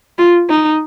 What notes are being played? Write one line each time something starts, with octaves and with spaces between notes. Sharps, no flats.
F4
D#4